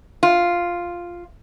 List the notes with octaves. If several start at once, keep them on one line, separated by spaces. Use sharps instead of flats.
F4